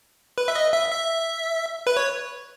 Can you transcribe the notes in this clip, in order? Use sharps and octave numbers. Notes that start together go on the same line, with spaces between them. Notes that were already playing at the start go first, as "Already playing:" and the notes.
B4
E5
D#5
E5
E5
B4
C#5